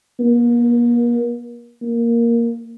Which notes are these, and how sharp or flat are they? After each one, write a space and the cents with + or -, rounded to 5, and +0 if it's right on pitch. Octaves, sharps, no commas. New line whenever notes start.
A#3 +40
A#3 +0